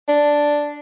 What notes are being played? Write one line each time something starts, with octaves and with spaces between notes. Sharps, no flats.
D4